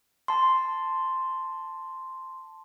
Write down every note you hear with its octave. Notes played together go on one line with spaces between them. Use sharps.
A5 C6